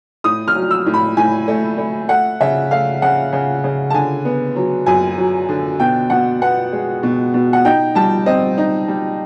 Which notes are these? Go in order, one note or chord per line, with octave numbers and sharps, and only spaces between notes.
A2 D#6
F6
F#3
E6
A2
B5
A2 G#5
A3
A3
A3 F#5
C#3 E5
A3 F5
C#3 F#5
C#3
C#3
A5
D3 G#5
B3
F#3
F#2 G#5
F#3
D3
B2 G5
B2 F#5
B3 F#5
G#3
B2
B2
F#5
D#4 G5
G3 A5
C4 D#5
D#4
G3